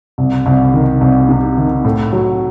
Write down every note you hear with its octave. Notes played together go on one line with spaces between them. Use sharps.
C2
C2
D#3
C2
C3
D#3
A2
F#3